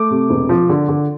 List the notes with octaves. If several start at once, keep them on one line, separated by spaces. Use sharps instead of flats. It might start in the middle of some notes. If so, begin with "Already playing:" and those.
Already playing: A3 D6
C3
E1
F3
D3
D3